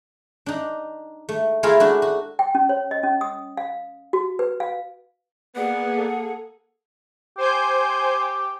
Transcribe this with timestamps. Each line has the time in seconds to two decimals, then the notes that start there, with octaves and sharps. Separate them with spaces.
0.46 D4 D#4
1.29 A3
1.63 A3 E4 F4 G#4 A#4 A5
1.80 A3 D4 F#4
2.02 F#4
2.39 G5
2.55 C#4
2.69 C#5
2.91 D#5
3.03 C#4
3.21 D#6
3.57 F5
4.13 F#4
4.39 B4
4.60 F5
5.56 A#3 B3 G#4 B4 D5 F#5
5.97 A4
7.38 G4 C5 G#5 G6